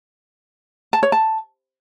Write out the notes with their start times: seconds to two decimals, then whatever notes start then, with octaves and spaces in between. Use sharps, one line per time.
0.93 A5
1.03 C#5
1.12 A5